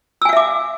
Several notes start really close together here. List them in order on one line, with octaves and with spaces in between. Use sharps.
E6 G#5 F5 E5 D6